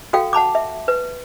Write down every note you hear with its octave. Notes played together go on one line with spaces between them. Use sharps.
F#4 A4 F5 G5
F#5 A5 B5 D6
E5
B4